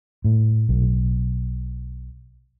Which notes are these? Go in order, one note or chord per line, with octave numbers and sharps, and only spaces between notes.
A2
B1